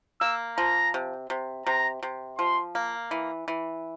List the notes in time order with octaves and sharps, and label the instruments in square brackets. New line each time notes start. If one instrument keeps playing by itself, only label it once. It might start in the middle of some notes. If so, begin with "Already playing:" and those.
[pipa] A#3 [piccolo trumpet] E6
[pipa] F3 [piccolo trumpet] A#5
[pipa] C3
C3
[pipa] C3 [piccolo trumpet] A#5
[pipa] C3
[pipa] F3 [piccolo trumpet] C6
[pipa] A#3
E3
E3